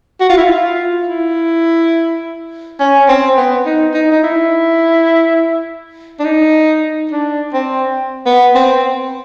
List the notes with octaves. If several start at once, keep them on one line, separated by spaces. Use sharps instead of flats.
F#4
F4
E4
F4
E4
C#4
C4
B3
D#4
D#4
D#4
E4
D4
D#4
D4
C4
B3
C4